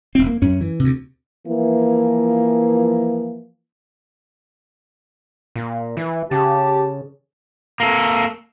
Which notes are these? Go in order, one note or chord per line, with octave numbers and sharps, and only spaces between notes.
E1 C4
A#3
F#2 C#4
E3
D2 C3
E3 F3 A#3
A#2
E3
C#3 G4 A5
A#3 A4